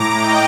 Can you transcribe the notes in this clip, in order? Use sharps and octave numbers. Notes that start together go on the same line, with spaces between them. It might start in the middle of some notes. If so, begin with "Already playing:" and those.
Already playing: A2 A#5 D6
D#5 G5